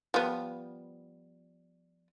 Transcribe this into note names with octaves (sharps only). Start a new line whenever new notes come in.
F3 G3 B3